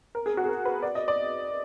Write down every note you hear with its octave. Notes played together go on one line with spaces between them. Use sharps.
A#4
G#4
F#4
G#4
A#4
B4
D5
D#5
D5